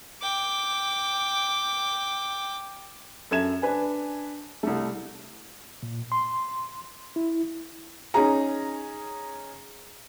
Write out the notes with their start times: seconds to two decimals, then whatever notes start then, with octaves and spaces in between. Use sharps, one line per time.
0.21 G5 D6
3.31 F#2 A4 E5 G#6 E7
3.62 D4 B4 G#5
4.63 C2 A3
5.83 A#2
6.12 C6
7.16 E4
8.14 C#4 D#4 G#4 A#5